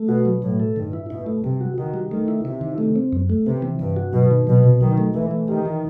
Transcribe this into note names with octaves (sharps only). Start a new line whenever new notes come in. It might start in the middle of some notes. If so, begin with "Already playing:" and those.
Already playing: A3
B2 F#4
F#3
A2 F#3
A4
G2 D#3
E4
B2 E4
A3
C3 G3
F#4
D#3 F#4
G3
D#3 A3
E4
C3 E4
D#3
A3
C4
F#2
A3
C3 B3
E3
G2 E3
F#4
B2 F#3
D#3
B2 F#3
C3
D#3 F#3
A3
E3 A3
A3
D#3 G4
E3